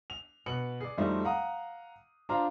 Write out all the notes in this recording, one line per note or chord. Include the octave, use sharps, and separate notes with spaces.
F7
B2 B4 C#7 F#7
G#4 D5
F2 F#3 G3 A3 C4 D#4
F5 F#5 A#5 D#6
D4 F4 C5 D5 F5 A#5